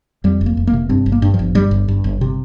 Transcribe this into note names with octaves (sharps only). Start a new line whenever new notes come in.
F2 G3
F1
A#3
F1
A#3
C3
G2 C4
G1
A#3
G2
F3
G1
G2 G3
G1
G2
G1
C3